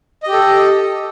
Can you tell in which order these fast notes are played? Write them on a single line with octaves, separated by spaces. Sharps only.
D#5 G4 A4